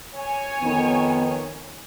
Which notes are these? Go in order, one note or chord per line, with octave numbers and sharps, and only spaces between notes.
C#5 G#5
F2 D#3 B3